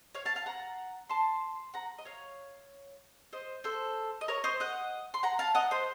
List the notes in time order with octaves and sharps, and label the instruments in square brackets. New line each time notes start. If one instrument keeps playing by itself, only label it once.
[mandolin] C#5 F5
F5 A5
F5 A5
F#5 A#5
A5 C6
F#5 A#5
D#5
C#5 F5
C5 D#5
A4 C5
D#5
A#4 C#5
C5 D#5
D#5 F#5
C6
F#5 A#5
F5 A5
D#5 F#5
C5 D#5